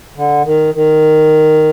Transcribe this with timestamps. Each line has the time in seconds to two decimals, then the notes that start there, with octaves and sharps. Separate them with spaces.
0.17 D3
0.45 D#3
0.74 D#3